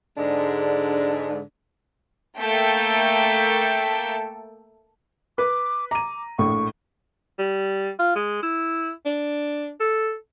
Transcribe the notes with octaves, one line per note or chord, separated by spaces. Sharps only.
G#2 D3 G#3 D4
A3 A#3 A4 G5 G6 B6
B4 D6
A#5 D6 D#7
A#1 A2 C#6
G3
F4
G#3
E4
D4
A4